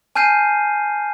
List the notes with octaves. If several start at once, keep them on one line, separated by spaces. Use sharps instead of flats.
G#5 A5 F6 G6 C7 D#7